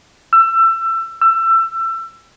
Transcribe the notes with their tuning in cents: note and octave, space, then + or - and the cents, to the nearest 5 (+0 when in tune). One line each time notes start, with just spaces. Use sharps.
E6 +25
E6 +25